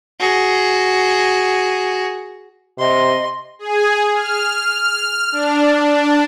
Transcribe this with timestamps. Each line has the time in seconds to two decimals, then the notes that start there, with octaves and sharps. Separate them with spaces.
0.20 F#4 G#4
2.79 C3 D#5 C6
3.59 G#4
4.14 F6
5.32 D4